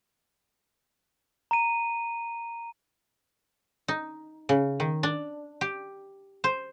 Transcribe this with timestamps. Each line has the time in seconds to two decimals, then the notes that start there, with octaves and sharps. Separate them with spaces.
1.51 A#5 D#7
3.88 D#4
4.49 C#3
4.80 D#3
5.03 D4
5.61 G4
6.44 C5